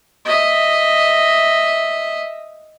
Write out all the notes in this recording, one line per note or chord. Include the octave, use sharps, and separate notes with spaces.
D#5 E5